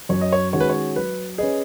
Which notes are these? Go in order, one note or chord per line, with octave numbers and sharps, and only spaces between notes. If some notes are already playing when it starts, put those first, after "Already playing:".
F#2 C#5
D#5
C#5
D#3 G#3 C#4 F#4 C#5
B4
C#5
F#3 B4
C#4 G#4 B4 D#5